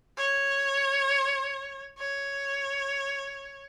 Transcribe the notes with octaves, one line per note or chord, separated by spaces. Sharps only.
C#5
C#5